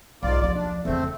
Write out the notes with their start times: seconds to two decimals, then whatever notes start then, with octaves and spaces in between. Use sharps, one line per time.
0.23 B1 G#2 F4 D5
0.41 D#2 F3 D5
0.55 D4
0.85 E2 C#3 A3 C4